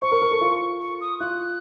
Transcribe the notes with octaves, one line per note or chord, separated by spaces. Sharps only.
C5 C#6
A#4
A#4
A4
F4
C#6
D#6
F4 F#6